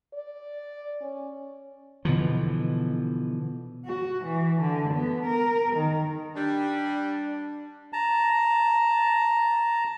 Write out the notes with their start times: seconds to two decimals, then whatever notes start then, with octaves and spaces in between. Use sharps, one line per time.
0.13 D5
1.01 C#4
2.05 B2 D3 E3 F3
3.86 F#4
4.25 E3
4.61 D3
4.94 B3
5.26 A#4
5.76 D#3
6.36 G3 D4
7.93 A5 A#5